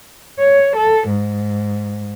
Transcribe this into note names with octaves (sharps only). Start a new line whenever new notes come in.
C#5
A4
G#2